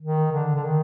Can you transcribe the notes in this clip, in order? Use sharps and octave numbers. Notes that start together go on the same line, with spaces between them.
D#3
D3
D3
D#3